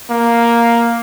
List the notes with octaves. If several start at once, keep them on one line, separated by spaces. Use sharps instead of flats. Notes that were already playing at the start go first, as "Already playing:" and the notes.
A#3